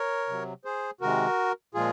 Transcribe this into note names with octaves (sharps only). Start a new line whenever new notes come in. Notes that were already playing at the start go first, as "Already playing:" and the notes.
Already playing: A#4 C#5
C3 F#3
G#4 C5
C3 D#3 G#3 F#4 A#4
A#2 F3 G#3 F4 G#4